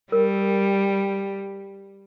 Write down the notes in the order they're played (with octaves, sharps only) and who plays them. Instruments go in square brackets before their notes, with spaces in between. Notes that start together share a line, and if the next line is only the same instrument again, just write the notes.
[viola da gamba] G3 [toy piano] A#4